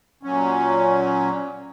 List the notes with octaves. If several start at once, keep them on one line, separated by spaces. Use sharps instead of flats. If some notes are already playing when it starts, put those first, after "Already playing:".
A#2 F#3 C#4